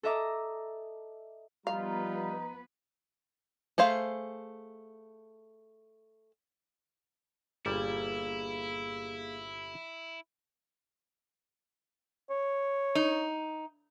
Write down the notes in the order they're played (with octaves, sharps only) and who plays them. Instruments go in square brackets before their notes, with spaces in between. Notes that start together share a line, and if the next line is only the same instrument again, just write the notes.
[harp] A4 D#5 E5 A#5 D6
[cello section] F3 B3 B4 [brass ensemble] G3 F4 [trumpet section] D#4 A#5 [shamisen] F5
[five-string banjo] A3 G#4 C5 F5
[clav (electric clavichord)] G1 A#2 G3 [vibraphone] A#3 G#4 F5 [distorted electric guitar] E4
[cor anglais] C#5
[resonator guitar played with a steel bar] D#4